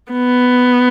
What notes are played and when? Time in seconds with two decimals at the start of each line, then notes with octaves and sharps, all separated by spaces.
0.12 B3